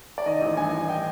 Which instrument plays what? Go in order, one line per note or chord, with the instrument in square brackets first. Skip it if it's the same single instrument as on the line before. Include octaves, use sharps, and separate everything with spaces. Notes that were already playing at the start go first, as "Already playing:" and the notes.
[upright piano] D5
D#3 D#5
A1
G2 G#5
A1
G5